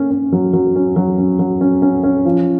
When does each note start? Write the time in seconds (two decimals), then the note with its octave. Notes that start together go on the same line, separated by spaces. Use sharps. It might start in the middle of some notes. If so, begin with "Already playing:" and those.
Already playing: A#3 C#4
0.11 C#4
0.32 F#3
0.53 F#3
0.76 C#4
0.96 F#3
1.18 C#4
1.39 F#3
1.61 C#4
1.82 C#4
2.03 C#4
2.25 F3